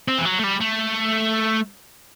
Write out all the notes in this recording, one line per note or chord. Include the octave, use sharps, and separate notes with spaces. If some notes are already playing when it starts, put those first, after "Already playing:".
C4
E3
F#3
A3
G3
A3